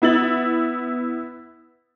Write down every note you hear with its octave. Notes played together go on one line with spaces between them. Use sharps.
B3 E4 A6 F#7